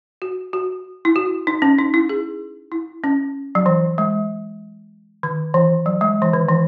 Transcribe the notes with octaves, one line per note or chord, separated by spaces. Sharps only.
F#4
F#4
E4
F#4
D#4
C#4
D#4
E4
G#4
E4
C#4
F#3
E3
G#3
D#3
E3
F#3
G#3
E3
D#3
E3